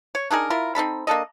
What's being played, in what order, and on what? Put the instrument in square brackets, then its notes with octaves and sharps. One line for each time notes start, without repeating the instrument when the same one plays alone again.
[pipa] C#5
D4 D#4 G#4 A#4
E4 F4 A#4
C4 D#4 A4 B5
A#3 D4 A4 D#5